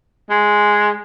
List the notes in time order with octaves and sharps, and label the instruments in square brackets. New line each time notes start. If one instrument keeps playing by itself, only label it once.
[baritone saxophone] G#3